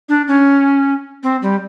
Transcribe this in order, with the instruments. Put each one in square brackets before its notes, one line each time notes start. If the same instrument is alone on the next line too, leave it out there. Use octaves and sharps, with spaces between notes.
[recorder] D4
C#4
C4
G3